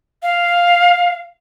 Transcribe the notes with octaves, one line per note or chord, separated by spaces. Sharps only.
F5